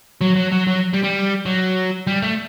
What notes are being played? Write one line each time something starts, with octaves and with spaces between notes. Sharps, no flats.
F#3
F#3
F#3
F#3
G3
G3
F#3
G3
A3